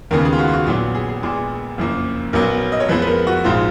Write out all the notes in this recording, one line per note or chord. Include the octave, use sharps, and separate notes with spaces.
D#2 C#3 G#3 B3 A#4
G#4
F4
F#4
F4
F#4
A#1 A#2 F#3 B3 F4
G#4
G#4
A#1 A#2 G#3 B3
F#1 F2 F3 A#3
B1 A#2 F#3 B3 A#4
D#5
C#5
F2 F3 G#3 B3 B4
B4
A#4
F#4
A#1 G#2 F3 F4